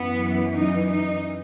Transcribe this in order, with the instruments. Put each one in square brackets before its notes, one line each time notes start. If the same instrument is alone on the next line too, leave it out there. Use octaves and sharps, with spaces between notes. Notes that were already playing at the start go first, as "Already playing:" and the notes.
Already playing: [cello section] F#2 E3 B3
D#4
D#4